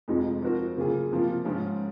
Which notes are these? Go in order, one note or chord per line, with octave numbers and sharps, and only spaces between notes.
F2 C3 F3 G#3 D#4
F3 C4 F#4 A#4
C#3 F#3 A#3 F4 G#4
C3 F3 A#3 F4
G#2 F3 G#3 C#4 F4